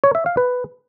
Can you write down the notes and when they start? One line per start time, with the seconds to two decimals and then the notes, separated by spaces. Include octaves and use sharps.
0.04 C#5
0.15 E5
0.26 F5
0.37 B4